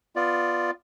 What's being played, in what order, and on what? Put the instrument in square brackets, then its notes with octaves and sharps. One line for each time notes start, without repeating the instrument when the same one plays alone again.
[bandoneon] B3 F4 D5